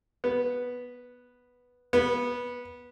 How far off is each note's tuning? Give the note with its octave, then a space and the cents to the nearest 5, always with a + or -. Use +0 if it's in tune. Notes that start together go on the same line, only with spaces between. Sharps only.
B3 -5
B3 -15